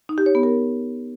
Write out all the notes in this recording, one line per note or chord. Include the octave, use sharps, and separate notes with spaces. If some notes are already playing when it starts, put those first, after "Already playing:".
D#4
G4
C#5
B3
A#4